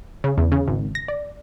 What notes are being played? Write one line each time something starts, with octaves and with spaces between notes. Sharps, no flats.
C#3
E2
C#3
G#1
A#6
D5